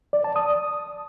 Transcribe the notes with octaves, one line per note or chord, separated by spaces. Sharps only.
D5
A5
D#6